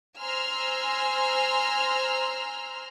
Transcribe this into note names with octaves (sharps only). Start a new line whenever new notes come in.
C5 G#5 A#5 C6 E6 F6